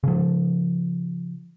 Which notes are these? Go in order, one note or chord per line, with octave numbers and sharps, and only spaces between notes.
C#3 F3